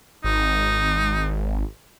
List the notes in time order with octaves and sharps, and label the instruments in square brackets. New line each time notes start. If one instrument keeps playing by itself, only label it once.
[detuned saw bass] G#1 [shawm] D#4